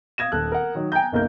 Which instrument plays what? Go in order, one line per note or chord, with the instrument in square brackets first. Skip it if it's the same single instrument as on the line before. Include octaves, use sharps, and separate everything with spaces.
[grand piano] F5 D#6 G#6 A#6 E7
D#1 A4 F#6
A#4 F#5
D#3 F#3 D#4
G5 G#5 A#5 G6
F#1 B1 A#3 A#4 G6